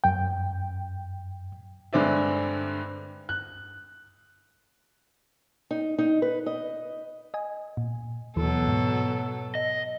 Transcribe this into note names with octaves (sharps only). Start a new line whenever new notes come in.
F#2 G5
G2 D3 G#3 C4 D5 E5
F#6
D#4
D#4
B4
D#5
D#5 G#5
A#2
D#2 B2 E3 F#3 A4
G#2
D#5